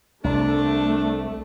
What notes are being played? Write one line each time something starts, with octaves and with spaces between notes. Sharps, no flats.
C2 A3 D4